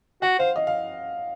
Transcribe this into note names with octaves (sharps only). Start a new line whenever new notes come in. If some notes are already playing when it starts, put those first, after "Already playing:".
F#4 F#5
C5 F5
D#5
F5